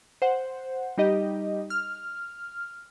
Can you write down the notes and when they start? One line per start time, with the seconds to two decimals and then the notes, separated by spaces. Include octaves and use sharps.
0.22 C5 F#5
0.98 G3 D#4 G4 D#5
1.70 F6